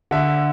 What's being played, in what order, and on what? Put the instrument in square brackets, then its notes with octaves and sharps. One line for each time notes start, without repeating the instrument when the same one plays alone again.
[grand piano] D3 E5